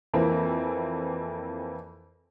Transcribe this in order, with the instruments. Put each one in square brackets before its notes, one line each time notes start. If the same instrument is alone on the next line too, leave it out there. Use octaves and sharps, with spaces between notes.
[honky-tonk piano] F2 E3 A#3 C4